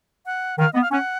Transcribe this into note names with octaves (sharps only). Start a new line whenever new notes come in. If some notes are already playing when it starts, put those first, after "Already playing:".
F#5
D#3 F5
B3 D#5
F5
C#4 F#5